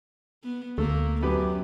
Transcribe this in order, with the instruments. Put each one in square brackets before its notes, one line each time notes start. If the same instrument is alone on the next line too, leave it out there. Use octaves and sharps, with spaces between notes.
[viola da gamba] B3
[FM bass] D2 [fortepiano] A3 [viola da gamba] A#3
[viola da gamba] F#2 [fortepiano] B3 G4